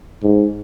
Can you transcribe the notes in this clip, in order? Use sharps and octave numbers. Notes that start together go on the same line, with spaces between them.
G#2